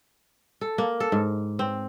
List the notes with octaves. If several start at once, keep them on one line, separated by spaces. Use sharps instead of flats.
A4
A#3
A4
G#2
C4